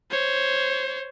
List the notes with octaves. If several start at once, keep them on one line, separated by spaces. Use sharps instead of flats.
C5 C#5